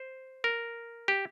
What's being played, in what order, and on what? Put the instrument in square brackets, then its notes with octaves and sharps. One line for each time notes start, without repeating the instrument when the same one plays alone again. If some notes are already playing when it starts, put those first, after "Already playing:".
Already playing: [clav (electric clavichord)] C5
A#4
G4